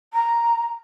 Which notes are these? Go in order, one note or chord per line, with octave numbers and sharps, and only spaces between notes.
A#5